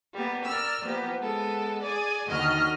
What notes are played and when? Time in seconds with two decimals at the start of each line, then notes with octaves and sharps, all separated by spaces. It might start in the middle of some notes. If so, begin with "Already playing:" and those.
0.13 G3 A#3 B3
0.44 A#4 D5 E6 F6
0.84 F3 A#3 B3 G4
1.18 G#3 B3 A4
1.82 G#4 D5 G#5
2.26 D#2 D3 D#3 F#4 D#5 F6